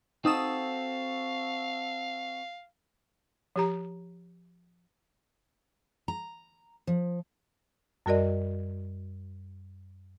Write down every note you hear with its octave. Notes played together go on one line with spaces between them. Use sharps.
C4 D#4 F#4 A4 F5 D#6 E7
F3 G4 A#5
A#5
F3
F#2 G3 F#4 A#4 D5 D#5